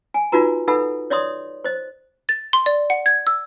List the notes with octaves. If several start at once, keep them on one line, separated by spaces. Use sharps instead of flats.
G#5
D#4 F4 F#4 B4 A#5
D#4 A4 B4 E5 F#5 B5
C#5 D5 E5 C6 D#6
C5 D#5
A6
C6
D5
F#5
G#6
E6